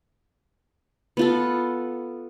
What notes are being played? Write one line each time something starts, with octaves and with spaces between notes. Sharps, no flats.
B3 F4 A4